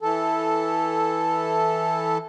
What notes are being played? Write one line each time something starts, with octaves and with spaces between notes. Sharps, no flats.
E3 A4